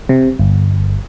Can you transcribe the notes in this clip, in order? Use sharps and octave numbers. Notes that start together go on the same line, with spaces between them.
C3
G1